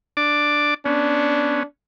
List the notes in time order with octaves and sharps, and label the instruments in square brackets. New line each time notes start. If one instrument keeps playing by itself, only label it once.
[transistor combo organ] D4 D5 D6
[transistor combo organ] B3 C#4 [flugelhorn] D4